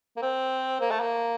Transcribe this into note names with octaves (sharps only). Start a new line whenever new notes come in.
A#3
C4
A#3
A3
A#3